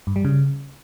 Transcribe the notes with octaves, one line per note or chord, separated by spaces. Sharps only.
G2
G3
C#3